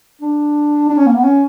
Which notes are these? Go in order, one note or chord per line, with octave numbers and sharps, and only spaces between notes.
D4
D4
C#4
A#3
B3
C#4